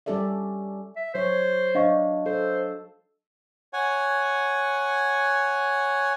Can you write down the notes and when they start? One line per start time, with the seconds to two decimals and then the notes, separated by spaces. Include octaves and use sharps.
0.06 G3 C#4 G4 A4 D5 E5
0.96 E5
1.14 F#3 C5 C#5
1.75 F#3 D4 D#5 F5 C#6
2.26 A4 C5
3.73 C#5 F#5 G#5